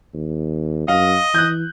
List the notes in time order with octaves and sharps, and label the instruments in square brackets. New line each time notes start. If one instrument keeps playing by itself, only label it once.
[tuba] D#2
[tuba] F#2 [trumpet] D#5 [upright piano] F5
[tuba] E3 [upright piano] F#6 G6